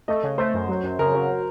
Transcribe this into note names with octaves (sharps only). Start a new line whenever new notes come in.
A3 D#5
C#3
A3 C5
F#2
F#3
F#2
C#3 A#4
F#3